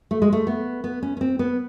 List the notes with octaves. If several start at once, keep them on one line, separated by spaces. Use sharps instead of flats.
A3
G#3
A3
B3
B3
C#4
C#4
C4
B3